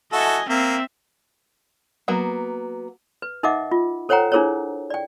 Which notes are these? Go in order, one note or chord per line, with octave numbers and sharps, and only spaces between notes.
E4 F#4 A4 D#5 G#5
A#3 C4 E5
F#3 A#3 B3
B4
D#4 A#4 D#5 E5 F#5 D6
F4
A4 C5 C#5 F#5 G5 A#5
D4 E4 G#4 A#4 C5 C#5
D5 G5